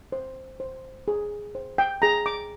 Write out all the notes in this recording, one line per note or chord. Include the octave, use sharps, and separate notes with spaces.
C5
C5
G#4
C5
G5
G#4 A#5
D6